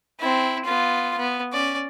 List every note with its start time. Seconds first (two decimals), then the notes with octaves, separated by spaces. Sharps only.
0.20 C4 E4
0.65 B3 F4
1.18 B3
1.53 C#4 D5